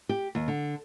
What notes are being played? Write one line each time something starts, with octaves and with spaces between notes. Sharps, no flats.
G4
D#2
D3